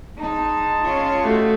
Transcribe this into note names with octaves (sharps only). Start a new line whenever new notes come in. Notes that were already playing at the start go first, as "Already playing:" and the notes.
G#3 D#4 G#4 A5
C#4 F4 C#5
A3 F#4 G4 D#5 F#5